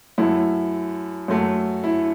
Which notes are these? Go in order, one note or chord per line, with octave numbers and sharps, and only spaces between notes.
F#2 F#3 A3 E4
F#2 F#3 A3
E4